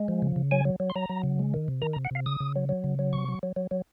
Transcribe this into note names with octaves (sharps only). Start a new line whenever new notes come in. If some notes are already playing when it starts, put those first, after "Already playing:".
Already playing: G#3
F3
C#3
C#3
F#3 G#5
F#3
F#3
C6
F#3 A#5
F#3
C#3
G#3
D#3
C3
D#3 A#5
A#5
C3
F#5
C3 F5
C#3 D#6
C#3
F#3
F#3
C#3
F#3
C3 C#6
F#3
F#3
F#3
F#3